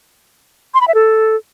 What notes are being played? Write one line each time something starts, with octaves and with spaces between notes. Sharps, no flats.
C6
B5
E5
A4